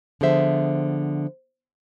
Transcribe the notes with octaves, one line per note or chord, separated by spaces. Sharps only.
D3 F3 B3 G#4 C5 E5